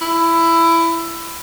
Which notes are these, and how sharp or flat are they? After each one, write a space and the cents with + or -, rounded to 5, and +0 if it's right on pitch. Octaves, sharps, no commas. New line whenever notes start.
E4 +15